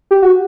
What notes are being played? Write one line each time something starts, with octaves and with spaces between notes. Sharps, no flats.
G4
F#4